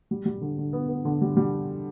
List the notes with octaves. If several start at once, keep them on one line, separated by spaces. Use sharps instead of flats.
G3
G3
D3
D3
B3
B3
D3
G3
G3